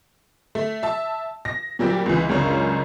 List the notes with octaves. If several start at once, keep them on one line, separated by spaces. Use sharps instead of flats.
A3
E5 A5
A#6
A#2 F#3 G3 C4 G4
C#2 E3
C#2 F#2 C#3 D4 C#5